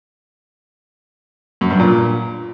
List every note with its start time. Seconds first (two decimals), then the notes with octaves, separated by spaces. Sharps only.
1.61 F#2
1.70 G2
1.80 A#2